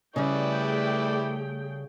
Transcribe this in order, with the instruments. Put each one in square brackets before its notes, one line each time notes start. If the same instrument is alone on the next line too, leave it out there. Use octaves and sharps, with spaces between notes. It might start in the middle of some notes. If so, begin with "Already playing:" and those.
[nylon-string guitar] C#3 G3 [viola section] A3 G#4 G5 [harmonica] E4 B4 D5